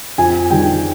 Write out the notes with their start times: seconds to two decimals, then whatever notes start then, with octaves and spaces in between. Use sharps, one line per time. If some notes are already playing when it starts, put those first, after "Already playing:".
0.18 F2 G#5
0.50 D#3 G3 G5